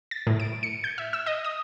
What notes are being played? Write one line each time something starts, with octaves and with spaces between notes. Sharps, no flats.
A6
A2
D7
C#7
G6
E5
E6
D#5
D#6